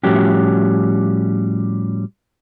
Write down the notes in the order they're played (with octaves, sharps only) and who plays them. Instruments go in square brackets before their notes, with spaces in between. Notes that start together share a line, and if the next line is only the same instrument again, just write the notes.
[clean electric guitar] A2 F3 G3 C#4 F#4 G4